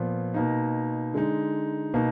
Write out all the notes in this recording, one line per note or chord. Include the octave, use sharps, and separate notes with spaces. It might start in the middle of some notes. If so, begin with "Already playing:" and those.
Already playing: A#2 F3 B3
B2 A#3 D#4
D3 G#3 D#4
B2 A#3 D#4